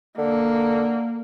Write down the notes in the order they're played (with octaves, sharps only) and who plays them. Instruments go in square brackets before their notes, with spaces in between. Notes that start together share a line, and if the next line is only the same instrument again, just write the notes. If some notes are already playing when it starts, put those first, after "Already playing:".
[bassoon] D3 [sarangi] A#3